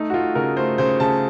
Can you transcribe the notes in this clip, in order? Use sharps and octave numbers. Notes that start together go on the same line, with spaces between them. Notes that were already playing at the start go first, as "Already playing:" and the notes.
Already playing: A3 D#4
F#4
A3 F4
C#3 A#4
A3 C5
C#3 C5
C#3 A5